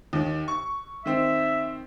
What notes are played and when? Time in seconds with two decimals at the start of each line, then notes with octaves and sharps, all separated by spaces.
0.13 D#2 D#3
0.48 C#6
1.06 D#3 C4 E5